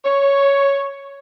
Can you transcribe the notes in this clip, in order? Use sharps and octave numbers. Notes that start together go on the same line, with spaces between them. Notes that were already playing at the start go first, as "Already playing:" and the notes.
C#5